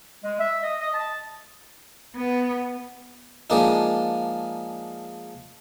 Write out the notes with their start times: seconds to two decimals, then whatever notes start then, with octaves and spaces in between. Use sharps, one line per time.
0.23 G#3
0.39 E5
0.63 D#5
0.80 D#5
0.93 A5
2.16 B3
3.50 F3 G#3 A#3 D4 D#4